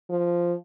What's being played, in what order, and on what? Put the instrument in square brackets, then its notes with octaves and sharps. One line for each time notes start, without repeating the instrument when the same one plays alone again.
[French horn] F3